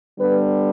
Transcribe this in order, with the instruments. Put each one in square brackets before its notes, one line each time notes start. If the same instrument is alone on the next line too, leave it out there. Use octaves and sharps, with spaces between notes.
[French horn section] D3 G3 B3 B4